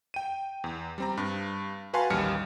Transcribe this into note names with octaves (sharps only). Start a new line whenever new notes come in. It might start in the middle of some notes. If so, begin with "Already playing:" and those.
G5 D#7
E2
G3 C4 A#5
G2
F#4 B4 F5 G#5 A5 C6
A1 D#2 G3 F6 C#7